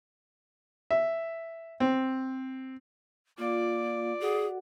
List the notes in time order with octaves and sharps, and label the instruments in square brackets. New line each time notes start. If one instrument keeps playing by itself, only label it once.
[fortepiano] E5
C4
[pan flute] A#3 [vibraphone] F4 [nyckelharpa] D5
[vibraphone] F#4 A4 F#5 [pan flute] G#4